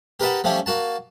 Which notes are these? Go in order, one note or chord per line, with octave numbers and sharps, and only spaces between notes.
G4 A#4 B4 D#5 F#5 A5
F3 G3 A3 C#4 G4
A#3 F#4 A5